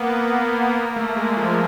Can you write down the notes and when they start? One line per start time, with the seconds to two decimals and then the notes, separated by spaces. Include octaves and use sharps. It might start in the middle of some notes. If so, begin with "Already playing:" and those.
Already playing: A#3 B3
0.77 A#3
0.96 A3
1.16 G#3
1.37 F3